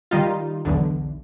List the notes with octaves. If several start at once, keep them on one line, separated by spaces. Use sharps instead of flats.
D#3 G3 D#4 F4
B1 E2 D3